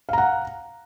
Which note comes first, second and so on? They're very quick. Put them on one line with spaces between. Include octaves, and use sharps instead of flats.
F5 A#5 F#5